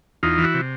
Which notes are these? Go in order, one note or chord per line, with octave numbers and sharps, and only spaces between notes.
E2 D#4 F4
E3
E4 F#4
C3